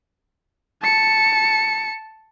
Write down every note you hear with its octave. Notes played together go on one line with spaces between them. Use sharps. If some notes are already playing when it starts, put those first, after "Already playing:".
A5 C#7